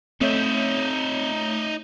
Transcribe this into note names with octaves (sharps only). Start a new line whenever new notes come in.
A3 C4 D#4 C#5 E5 G6